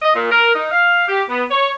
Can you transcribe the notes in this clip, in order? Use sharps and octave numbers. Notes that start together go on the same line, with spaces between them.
D#5
A#2
A#4
D#4
F5
G4
B3
C#5